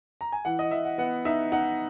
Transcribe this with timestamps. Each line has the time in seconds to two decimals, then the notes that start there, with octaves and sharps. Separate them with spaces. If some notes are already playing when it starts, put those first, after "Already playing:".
0.21 A#5
0.32 G#5
0.45 E3 F#5
0.59 D#5
0.71 E3 E5
0.85 F#5
0.98 B3 F#5
1.25 D#4 E5
1.52 D#4 F#5